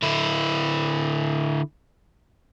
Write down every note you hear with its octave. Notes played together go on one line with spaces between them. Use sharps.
D3 E4